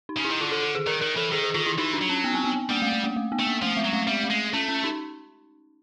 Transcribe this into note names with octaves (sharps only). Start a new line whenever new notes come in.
D#4
C#3
E4
D#3
D3 F4
A4
A4
G#4
D#3 A#4
D#3 A#4
E3 A4
D#3 G#4
G#4
D#3 F4
E4
E3 D#4
D4
F#3
C#4
B3
C4
B3
G3 A#3
A3
A3
A#3
A3
B3
A3
A#3
F3 A3
G#3
F#3
A3
G3 G#3
A3
G#3
A3 C#4
C#4
D#4